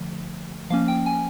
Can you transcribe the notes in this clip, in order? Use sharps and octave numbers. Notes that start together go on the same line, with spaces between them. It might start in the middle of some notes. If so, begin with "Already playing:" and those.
Already playing: D3 F3 A3
F3 A#3 C#4 F5
G5
G#5